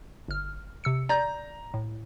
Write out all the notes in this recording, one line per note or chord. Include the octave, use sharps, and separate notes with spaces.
G1 F6
C3 E6 C#7
D5 A#5 G6
A2